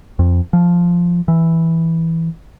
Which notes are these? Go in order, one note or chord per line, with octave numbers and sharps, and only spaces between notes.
F2
F3
E3